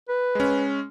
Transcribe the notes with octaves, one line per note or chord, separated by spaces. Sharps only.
B4
G#3 C#4